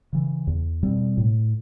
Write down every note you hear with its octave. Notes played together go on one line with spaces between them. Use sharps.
C#3 E3
E2
B2 G3 C4
A2